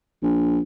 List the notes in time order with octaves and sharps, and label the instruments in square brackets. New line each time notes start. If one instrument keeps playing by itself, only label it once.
[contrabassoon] A#1